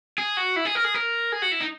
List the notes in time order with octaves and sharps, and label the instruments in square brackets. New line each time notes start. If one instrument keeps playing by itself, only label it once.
[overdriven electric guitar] G#4
F#4
E4
G#4
A#4
G#4
A#4
G#4
F#4
E4
D#4